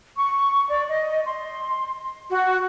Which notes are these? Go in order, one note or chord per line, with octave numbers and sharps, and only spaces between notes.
C#6
D5
D#5
C6
F#4